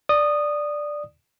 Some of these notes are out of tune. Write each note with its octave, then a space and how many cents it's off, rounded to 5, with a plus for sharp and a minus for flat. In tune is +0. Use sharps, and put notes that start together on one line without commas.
D5 +5 D#6 -15